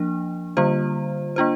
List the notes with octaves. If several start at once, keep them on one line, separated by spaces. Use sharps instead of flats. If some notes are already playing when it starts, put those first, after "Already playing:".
Already playing: F3 A#3 D4
D3 G3 A#3 F4 C5
A#3 D4 F4 C5